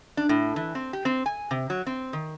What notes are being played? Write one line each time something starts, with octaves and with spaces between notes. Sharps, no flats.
D4
A2
E3
C4
G4
C4
G#5
C3
F#3
C4
D#3